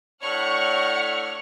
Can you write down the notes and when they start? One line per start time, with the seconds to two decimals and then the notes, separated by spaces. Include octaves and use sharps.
0.22 A2 D4 C#5 F#5 C#6 F6